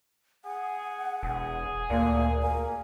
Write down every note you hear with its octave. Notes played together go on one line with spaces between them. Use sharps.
G#4 F#5
E1 G#4
D2 A#2 A#3
A#3 A#4 G#5